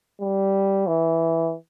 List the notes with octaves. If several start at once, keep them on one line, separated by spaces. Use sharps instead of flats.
G3
E3